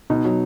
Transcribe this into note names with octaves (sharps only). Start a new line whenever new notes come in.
B2 D#4
F#3